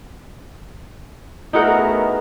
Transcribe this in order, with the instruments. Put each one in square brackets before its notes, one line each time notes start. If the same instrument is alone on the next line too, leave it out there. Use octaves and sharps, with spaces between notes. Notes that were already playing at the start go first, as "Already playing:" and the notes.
[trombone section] A3 B3 [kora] D#4 F#4 F#5 [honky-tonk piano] E4 G#4 A#4